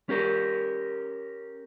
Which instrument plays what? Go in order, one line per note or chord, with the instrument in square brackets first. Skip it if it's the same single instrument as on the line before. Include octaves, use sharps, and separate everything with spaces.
[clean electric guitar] C#4 G4 A#4